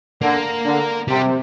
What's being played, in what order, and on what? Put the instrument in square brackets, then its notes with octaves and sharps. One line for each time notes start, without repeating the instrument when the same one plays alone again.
[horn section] D3 [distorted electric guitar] A#3
[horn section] D3
[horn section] C3 [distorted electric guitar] G3